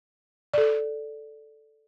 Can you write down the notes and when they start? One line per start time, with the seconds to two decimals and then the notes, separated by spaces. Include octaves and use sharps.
0.54 A4 D5